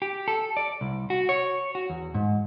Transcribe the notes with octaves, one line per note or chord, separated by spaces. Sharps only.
G4
A4
D5
C2
F#4
C#5
F#4
E2
G#2